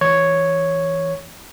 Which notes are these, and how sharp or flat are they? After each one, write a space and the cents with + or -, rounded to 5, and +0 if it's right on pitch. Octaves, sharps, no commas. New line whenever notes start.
E3 +0 C#5 +0